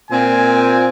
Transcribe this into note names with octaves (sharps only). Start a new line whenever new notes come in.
A#2 C4 G#5